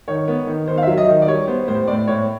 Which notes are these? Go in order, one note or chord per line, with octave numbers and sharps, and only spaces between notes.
D#3 C#5
B3
D#3
D#3 C5
F5
F#3 E5
D#5
D#3
D5
G3 C#5
B3 C5
A2 C5
A2 D5
A2 C#5